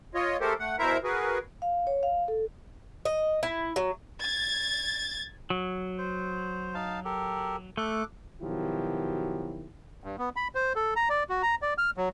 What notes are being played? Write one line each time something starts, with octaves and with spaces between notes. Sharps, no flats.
F4 C#5 D#5
G#3 A3 G4 A4 A#4 C5
A3 F#5
B2 E4 A#4 C5 E5 A#5
F#4 G#4 A#4 B4
F5
C#5
F5
A4
D#5
E4
F#3
G#6 A6
F#3
C5
D#4 F5 A5
G4 A4 A#4
A3 A4 D6 F#6
B2 D#3 F3 F#3 E4 G4
G2
B3
B5
C5
A4
A#5
D5
F#4
A#5
D5
F6
F#3